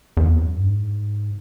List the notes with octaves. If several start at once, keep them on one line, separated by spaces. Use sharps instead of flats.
E2
F2
F#2
G2
G#2